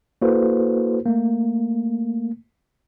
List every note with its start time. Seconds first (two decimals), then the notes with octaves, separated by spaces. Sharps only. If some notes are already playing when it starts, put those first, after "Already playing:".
0.22 A#3 E4 F#4 A4 B4 C5
1.06 A3 A#3